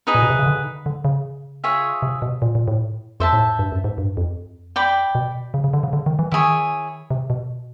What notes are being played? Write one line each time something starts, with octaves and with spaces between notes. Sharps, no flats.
D#4 G#4 B4
A#2
B2
C3
C#3
D3
D3
C#3
F4 G#4 C#5 E5
C3
B2
A#2
A#2
A2
F2 C5 E5 A5
A2
G2
F#2
G#2
G2
F2
D5 G5 B5
B2
C#3
C#3
D3
C#3
D3
D#3
E3
D#3 E4 G#4 C#5
C3
B2